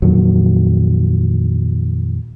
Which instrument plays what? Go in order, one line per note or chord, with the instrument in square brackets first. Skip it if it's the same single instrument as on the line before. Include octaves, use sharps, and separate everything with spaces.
[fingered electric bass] F2 A#2 D#3 F#3